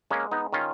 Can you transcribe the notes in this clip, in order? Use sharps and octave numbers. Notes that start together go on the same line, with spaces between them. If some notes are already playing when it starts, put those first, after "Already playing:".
G#3 A#3 C#4
B3 D#4
D#3 C#4 F4